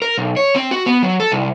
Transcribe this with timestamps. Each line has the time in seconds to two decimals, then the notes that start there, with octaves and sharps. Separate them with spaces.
0.02 A#4
0.18 B1
0.37 C#5
0.56 C4
0.71 F#4
0.86 B3
1.03 F#3
1.20 A4
1.32 C2